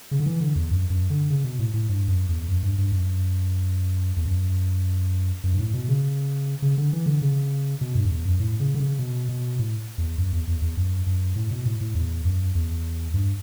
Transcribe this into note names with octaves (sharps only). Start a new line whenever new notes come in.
C#3
D3
E3
D3
E2
F#2
F#2
D3
C#3
B2
A2
A2
G2
F#2
E2
F#2
G2
G2
F#2
E2
F#2
F#2
G2
A2
B2
C#3
C#3
D3
E3
D3
C#3
B2
G2
F#2
E2
F#2
A2
C#3
D3
C#3
B2
B2
A2
E2
F#2
E2
E2
E2
F#2
F#2
A2
B2
A2
A2
E2
F#2
E2
G2